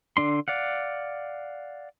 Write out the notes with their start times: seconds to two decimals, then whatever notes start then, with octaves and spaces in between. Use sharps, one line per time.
0.17 D3 D4 C6
0.48 D5 F5 F#5